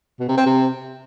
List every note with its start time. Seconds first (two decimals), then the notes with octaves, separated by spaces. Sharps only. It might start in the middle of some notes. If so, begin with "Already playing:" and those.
0.20 B2
0.29 C3
0.37 C4
0.46 C3